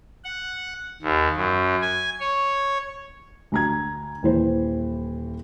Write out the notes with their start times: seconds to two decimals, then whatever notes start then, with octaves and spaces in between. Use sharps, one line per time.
0.24 F#5
1.02 D#2
1.36 F#2
1.82 G#5
2.20 C#5
3.52 D2 A#5 G#6
4.23 D#1 E3 C5